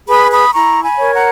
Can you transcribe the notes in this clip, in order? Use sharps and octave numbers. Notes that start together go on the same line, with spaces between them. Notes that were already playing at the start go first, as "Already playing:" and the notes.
G#4 B4 B5 D#6
B5 D#6
E4 A#5 C#6
G#5 B5
A#4 C#5
F#5 A#5